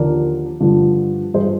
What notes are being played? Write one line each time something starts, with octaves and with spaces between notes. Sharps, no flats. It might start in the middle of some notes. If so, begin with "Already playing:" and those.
Already playing: D#2 D3 F3 A#4 D5
G2 D3 F3
G2 F3 G#4 C5